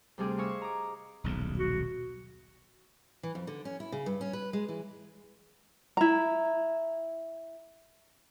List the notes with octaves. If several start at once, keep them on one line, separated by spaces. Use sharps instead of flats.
D2 C3 G3 C4 G#4 D6
D#5 F5 G#5 C#6 D#6 E6
A#5 D6
D#1 B1 G#2
F#4
E3
F2
D3
C#4
E4
C#3
G2
C#4
B4
G#3
E3
E4 A#5